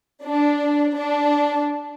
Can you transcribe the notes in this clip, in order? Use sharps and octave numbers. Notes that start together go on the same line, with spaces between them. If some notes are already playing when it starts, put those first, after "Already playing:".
D4
D4